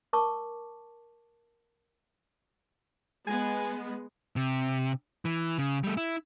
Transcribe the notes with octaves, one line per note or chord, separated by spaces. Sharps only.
A#4 A5 C#6 D6 E6
G#3 B3 G#5
C3
E3
C#3
G3 A3
E4